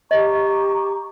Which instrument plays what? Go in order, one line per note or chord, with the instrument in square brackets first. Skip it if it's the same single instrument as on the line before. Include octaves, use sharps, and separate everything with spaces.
[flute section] G4 A#5 C#6 [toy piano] D#5